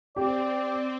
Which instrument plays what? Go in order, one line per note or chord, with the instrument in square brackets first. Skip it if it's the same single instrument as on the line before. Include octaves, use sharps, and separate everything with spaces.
[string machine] C4 [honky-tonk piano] G4 [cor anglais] D5